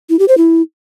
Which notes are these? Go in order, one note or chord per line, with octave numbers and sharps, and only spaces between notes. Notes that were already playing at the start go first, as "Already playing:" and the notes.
E4
G4
C5
E4